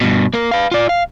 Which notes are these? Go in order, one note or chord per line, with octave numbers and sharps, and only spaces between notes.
G2 B2
A#3 A#4
B4 F5
F4 D5
F5